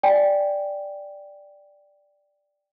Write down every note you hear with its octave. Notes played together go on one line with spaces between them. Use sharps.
D5 G5 G#5